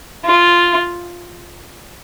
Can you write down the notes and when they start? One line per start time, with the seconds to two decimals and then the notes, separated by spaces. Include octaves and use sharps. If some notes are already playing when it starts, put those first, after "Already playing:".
0.25 F4